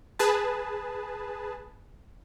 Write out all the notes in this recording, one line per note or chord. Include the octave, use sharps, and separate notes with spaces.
G#4 B4 A5